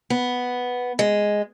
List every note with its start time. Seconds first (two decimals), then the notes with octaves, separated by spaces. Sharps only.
0.10 B3
0.99 G#3